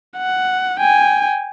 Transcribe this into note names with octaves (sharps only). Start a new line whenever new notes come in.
F#5
G5 G#5